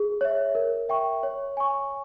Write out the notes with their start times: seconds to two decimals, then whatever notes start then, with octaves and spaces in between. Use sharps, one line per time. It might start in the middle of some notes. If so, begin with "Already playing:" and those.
Already playing: G#4
0.21 C#5 E5
0.55 A#4
0.89 E5 G5 C#6
1.23 C#5
1.57 G#5 C#6